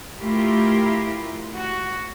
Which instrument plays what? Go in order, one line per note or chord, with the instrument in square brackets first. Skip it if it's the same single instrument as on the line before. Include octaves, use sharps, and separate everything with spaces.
[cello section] A3 E4 F4 G4 A#4
F#4